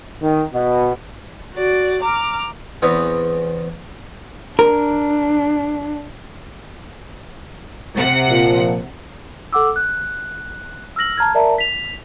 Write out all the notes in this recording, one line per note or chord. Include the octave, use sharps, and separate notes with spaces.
D#3
B2
F#4 D5
A#5 D6 F6
E2 B3 C4 E4 C#5 G5
D4 A#4
C3 F#5
A#2 F3
A4 F#5 D6 E6
F#6
E6 F6 A#6 F#7
A5 A#5 F6 G#6
A#4 D5 E5 A5 A#5
B6 F7